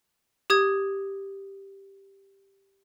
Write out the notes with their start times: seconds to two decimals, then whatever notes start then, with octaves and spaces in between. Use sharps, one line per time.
0.50 G4 D#6 G#6